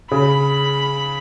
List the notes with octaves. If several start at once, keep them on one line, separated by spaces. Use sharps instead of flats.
C#3 B5